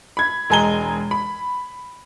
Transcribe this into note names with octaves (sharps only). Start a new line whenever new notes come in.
B5 G#6
E1 G#3 G#5 A#5 G7
B5